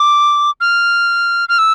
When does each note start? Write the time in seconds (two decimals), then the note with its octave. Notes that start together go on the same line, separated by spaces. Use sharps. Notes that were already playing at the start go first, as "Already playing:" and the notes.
Already playing: D6
0.61 F6
1.49 F6
1.59 E6